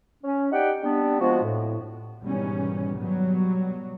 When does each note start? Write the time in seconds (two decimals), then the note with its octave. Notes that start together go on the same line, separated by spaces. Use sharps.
0.23 C#4
0.52 D#4 G4 D5 F#5 G5
0.82 G3 B3 C4 D4
1.20 F3 G#3 B3 F#4
1.44 A2
2.21 G#2 B2 D#3 E3 G3 C#4
2.97 B2 F#3 G3 B3